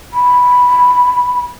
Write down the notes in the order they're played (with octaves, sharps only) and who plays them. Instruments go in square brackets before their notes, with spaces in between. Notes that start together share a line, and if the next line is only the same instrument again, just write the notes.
[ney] B5